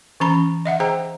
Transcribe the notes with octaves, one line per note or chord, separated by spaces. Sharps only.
E3 C#4 A#5 B5
D#5 E5 F#5
G#4 C5 G5 A#5